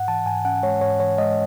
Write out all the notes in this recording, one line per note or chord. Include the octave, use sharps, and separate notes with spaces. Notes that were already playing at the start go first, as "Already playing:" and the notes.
Already playing: G#2 F#5
E3 A5
G#2 G#5
C#4 F#5
G#3 C#5
G#2 C#5
E3 C#5
G#3 D#5